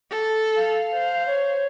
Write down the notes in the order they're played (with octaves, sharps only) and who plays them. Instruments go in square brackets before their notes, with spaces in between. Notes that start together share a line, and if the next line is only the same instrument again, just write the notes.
[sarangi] A4
[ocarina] F5
[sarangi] C5
[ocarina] C#5